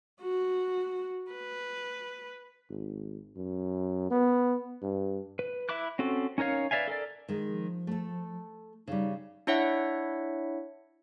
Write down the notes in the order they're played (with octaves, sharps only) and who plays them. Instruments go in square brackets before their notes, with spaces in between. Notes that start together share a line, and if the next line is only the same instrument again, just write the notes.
[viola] F#4
B4
[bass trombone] G#1
F#2
B3
G2
[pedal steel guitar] B4
E4 E5 B5 D6 F#6
C4 C#4 F#4 A4
C#4 D#4 A#4 C#5 F5
B4 D5 E5 F5 G#5
A4 A#4 D5
[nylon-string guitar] D#3 G#3
[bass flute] F3
[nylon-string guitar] A3 A4
[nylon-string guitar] C#3 G3 [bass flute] D#4
[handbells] D4 E4 C#5 E5 F#5